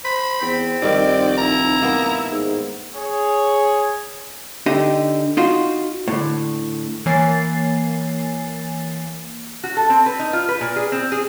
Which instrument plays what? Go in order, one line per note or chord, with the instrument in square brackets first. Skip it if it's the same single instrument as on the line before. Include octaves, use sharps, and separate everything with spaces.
[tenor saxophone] C5 [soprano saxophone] B5
[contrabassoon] E2 [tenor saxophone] C4
[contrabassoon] F1 [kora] G2 D#3 A#4 [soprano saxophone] D5
[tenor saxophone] E4 [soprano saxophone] A#5
[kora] A#3 B3
[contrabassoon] G#2
[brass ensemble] G#4 C#5
[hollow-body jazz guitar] D3 D#4 G4 D#5
D#4 F4 F#4
A2 D3
[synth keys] E3 A#3 C#5 G#5 A6 C7
[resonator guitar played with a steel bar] F#4
A4
C4
B4
D#4
F4
B4
A#2
G#4
C4
G#4